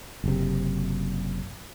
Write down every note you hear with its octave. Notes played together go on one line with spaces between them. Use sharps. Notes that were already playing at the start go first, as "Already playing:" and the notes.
F#1 C3